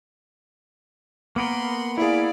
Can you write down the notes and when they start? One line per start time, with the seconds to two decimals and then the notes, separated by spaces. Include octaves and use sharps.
1.36 A#3 B3 A#4 B5 C6
1.98 E4 G#4 D5 F5